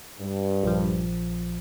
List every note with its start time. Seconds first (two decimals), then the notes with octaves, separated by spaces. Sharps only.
0.19 G2
0.63 A#1 F3